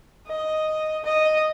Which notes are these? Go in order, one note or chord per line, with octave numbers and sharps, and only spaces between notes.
D#5
D#5